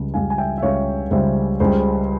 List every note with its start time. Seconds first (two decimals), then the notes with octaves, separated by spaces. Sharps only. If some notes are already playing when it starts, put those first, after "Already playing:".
Already playing: C#2 C#3 G3
0.14 C#2 C#3 G3 F5 G#5
0.30 G#5
0.38 E5 G5
0.58 E5
0.62 C#2 C#3 G3 C#5 F5
1.11 C#2 C#3 G3 C5 E5
1.60 C#2 C#3 G3 G#4 C5